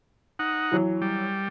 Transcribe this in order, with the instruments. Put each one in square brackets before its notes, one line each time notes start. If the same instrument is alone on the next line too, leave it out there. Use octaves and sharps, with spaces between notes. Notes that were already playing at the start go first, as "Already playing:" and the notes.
[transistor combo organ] D#4 F#5
[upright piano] E3 F#3 C#5
[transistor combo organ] G3